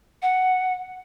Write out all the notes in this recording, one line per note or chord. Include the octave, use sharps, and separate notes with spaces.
F#5